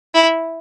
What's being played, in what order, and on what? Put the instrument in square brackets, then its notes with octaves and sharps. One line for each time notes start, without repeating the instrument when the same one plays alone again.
[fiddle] E4